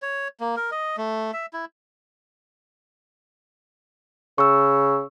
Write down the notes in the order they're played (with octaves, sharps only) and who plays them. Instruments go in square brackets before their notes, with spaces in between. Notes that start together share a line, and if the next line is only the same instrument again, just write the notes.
[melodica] C#5
A#3
A#4
D#5
A3
E5
E4
[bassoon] C#3 [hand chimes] C#6 E6